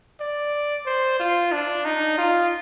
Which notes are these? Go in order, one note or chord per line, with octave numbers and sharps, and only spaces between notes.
D5
C5
F4
D4
D#4
F4